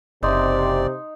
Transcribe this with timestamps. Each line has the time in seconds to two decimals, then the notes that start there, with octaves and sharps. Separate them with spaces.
0.23 F#1 C3 D#4 D5 C6